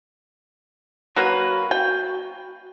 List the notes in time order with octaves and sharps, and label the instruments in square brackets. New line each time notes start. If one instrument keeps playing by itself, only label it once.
[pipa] F#3 A#3 B4 [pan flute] F#4
[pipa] G5